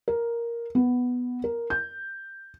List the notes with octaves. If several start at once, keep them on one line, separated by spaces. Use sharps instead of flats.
A#4
B3
A#4
G6